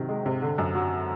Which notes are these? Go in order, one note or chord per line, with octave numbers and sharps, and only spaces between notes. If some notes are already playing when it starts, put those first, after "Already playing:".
Already playing: C3 D#3 F#3
G#3
C3
D3
F#2
F#3